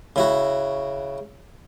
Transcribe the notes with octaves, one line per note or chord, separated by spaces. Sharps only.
C#3 E4 F#4